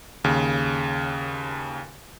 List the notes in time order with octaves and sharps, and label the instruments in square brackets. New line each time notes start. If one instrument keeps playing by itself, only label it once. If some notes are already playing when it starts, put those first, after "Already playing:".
[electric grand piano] D#2 C#3